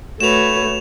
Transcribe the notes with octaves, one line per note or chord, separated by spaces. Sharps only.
A3 F#4 B4 C#5 E7 F7